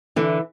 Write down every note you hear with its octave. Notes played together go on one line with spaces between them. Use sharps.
D3 E3